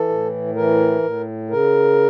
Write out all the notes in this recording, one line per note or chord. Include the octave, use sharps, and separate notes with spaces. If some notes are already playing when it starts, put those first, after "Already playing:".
Already playing: E3 A4
A2
E3 A#4
A2
C#3 A#4